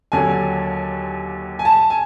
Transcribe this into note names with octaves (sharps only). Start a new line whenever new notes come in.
D#2 D3 F#3 G#5
G#5
A5
G#5